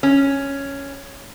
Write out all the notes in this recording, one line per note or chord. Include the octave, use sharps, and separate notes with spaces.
C#4